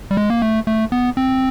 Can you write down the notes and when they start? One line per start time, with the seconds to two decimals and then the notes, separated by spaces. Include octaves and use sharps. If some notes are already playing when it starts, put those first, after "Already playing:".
0.11 G3
0.17 G#3
0.30 A#3
0.42 A3
0.67 A3
0.92 B3
1.17 C4